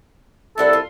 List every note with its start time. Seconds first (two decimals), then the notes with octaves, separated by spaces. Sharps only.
0.58 C2 A3 D4 E4 A4 F#5
0.73 F4